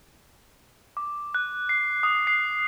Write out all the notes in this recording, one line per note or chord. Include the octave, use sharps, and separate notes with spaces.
D6
F#6
C7
D#6
C7